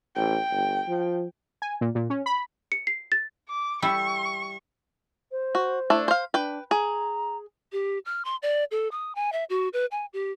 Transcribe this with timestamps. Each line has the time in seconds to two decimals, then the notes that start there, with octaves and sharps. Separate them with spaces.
0.16 A1 G5
0.51 G1
0.87 F3
1.62 G#5
1.81 A#2
1.95 A#2
2.10 C#4
2.26 B5
2.72 C#7
2.87 C7
3.12 A6
3.49 D6
3.82 G3 E4 C#6
5.32 C5
5.55 F#4
5.90 A3 D4 E4
6.08 C5 F5
6.34 D4 B4 G5
6.71 G#4 A#5
7.72 G4
8.05 F6
8.25 C6
8.42 D5
8.71 A4
8.91 D#6
9.15 G#5
9.33 E5
9.50 F#4
9.73 B4
9.91 G#5
10.13 G4